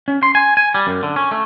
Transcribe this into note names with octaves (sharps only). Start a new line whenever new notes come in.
C#4
C6
G#5
G#5
G3
F#2
D3
C#4
A3